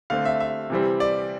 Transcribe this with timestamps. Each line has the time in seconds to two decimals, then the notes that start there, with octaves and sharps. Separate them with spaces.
0.10 D3 A3 C4 F5
0.25 E5
0.40 E5
0.70 C3 E3 G3 C4
1.00 D5